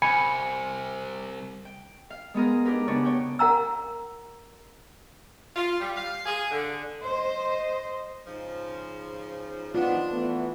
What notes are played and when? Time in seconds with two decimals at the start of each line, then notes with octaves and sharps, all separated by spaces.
0.02 C2 G#5 B5 C#7
1.65 G5
2.10 F5
2.34 G#3 B3 G#4 A#4
2.65 D4 D#4 G4 G#4 A#4 B4
2.88 C#3 B3 D4 C#5 D5 F#6
3.05 C#5 G5
3.39 A#4 F#5 A#5 E6
5.55 F4
5.79 G3
5.95 F5
6.26 G#4
6.50 D3
7.03 C5 D#5
8.26 G#2 C#3 F3
9.75 D#3 F3 B3 D4 F4
10.09 E3 A3 B3